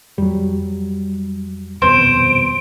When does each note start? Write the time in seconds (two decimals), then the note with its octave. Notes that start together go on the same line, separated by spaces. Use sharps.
0.18 F2 F#3 G3
1.82 D#1 F2 B2 C5 D7